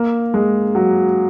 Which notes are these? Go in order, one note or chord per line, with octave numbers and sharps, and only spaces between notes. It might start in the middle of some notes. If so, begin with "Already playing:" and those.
Already playing: A#3
G#3
F#3